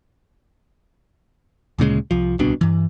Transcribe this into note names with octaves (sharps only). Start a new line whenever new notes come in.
D2 A#2 C#3 G#3
C2 F3
D1 C2 B2 D4
G2 E3